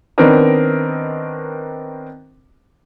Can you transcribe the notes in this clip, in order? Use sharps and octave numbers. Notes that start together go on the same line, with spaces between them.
D#3 B3 C4 D4 A#4 D#5